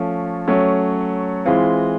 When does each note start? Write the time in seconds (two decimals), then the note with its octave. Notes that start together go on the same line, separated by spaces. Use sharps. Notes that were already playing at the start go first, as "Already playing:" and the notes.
Already playing: F3 A3 C#4
0.47 F#3 A3 C#4
1.46 E3 G#3 C4 F4